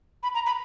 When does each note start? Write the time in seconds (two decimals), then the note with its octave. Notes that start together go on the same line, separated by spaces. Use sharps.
0.23 B5
0.34 A#5
0.46 B5